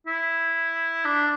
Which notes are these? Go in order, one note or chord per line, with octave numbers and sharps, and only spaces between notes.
E4
D4